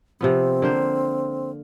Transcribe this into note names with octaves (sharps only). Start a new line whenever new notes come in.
C3 F3 B3 C4
D3 A#3 C5